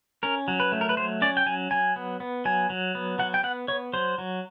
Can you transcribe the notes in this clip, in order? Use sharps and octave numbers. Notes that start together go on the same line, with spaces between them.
C#4 A#4
F#3
B4
A3
A#4
B4
F#3 C5
C#4 D5
G5
F#3 G#5
F#3 G#5
B3
B3
F#3 G#5
F#3
B3
F#3 F#5
G5
B3 F#5
B3 C#5
F#3 C5
F#3